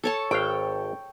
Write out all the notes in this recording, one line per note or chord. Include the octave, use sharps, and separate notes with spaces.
A4 C#5 A5
G#1 F5 G5